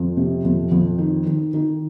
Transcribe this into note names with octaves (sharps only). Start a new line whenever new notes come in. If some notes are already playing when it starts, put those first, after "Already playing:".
Already playing: F2
C3
F2
F2
D#3
D#3
D#3